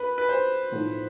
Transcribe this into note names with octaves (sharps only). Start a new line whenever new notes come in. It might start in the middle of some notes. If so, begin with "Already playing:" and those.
Already playing: D2 A#3 B4
B4
C5
B1 A2 F3 A3